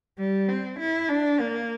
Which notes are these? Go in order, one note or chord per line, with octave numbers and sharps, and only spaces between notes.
G3
C4
E4
D4
A#3